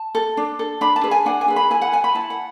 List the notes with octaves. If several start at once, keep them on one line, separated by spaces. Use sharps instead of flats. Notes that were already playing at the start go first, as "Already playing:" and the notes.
Already playing: A5
A4
D4
A4
D4 B5
A5
G#4 B4
G#5
D4 F#5
G#5
G#4 B4
B5
E4 G#5
F#5
B4 G#5
B5
E4 A5
F#5